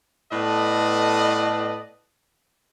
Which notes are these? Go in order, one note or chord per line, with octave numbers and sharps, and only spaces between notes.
A2 B3 A4 B4 D5 D#5